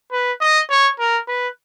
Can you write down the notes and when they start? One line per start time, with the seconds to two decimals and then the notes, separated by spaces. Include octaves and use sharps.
0.12 B4
0.41 D#5
0.70 C#5
0.99 A#4
1.28 B4